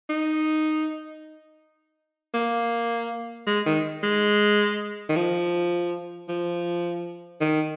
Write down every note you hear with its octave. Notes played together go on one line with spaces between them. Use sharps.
D#4
A#3
G#3
D#3
G#3
D#3
F3
F3
D#3